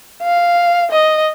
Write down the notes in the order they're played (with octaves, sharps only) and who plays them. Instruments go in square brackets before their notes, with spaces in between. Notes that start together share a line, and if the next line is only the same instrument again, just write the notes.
[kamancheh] F5
D#5